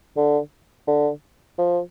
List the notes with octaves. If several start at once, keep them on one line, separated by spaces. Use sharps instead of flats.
D3
D3
F3